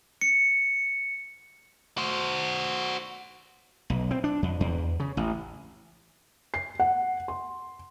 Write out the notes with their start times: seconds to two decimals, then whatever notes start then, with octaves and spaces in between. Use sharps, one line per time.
0.21 C#7
1.98 F#4 C5
3.90 B1
4.11 C4
4.24 D4
4.42 F2
4.60 E2
5.00 C#3
5.17 A1
6.54 C7
6.80 F#5
7.28 C6